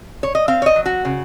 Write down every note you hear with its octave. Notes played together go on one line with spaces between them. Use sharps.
C#5
D#5
C4 F5
C#5
D#5
F#3
F#4
C#3